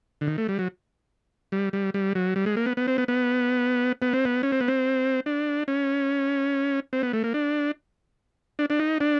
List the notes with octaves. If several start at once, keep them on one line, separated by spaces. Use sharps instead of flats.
D3
D#3
A3
G3
F#3
G3
G3
G3
F#3
G3
G#3
A#3
B3
B3
C4
B3
B3
B3
C4
B3
C#4
C4
B3
C4
D4
C#4
C4
B3
A3
A#3
D4
D4
D4
D#4
D4